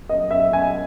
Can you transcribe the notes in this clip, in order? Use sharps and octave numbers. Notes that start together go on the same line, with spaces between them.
D#5
E5
G#5